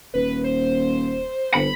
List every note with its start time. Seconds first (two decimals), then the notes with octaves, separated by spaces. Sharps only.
0.14 D#1 B4
0.44 C5
1.54 G1 B5